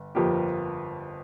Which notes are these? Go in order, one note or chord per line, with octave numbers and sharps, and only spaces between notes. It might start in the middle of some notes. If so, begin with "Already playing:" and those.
Already playing: G1
G1 F2 F3 A#3 G4